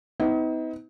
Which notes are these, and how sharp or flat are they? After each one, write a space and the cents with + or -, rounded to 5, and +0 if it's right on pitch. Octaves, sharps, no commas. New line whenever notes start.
B3 +40 D#4 +40